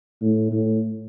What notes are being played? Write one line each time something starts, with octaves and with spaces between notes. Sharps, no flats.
A2
A2